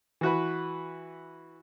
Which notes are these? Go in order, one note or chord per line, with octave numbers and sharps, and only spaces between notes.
E3 F#4 B4